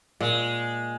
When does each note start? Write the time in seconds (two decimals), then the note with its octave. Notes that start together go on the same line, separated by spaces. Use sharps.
0.20 A#2 G#3